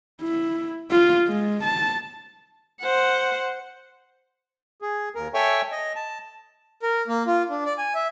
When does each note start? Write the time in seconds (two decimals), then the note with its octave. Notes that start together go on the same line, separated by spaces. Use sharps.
0.21 E4
0.91 F4
1.28 G#3
1.64 A5
2.81 C5 F#5
4.82 G#4
5.15 D#2 A#4
5.34 A4 C#5 E5 G5 G#5 C#6
5.72 D#5
5.96 A5
6.83 A#4
7.08 A#3
7.27 F4
7.50 D4
7.65 D5
7.78 G#5
7.95 E5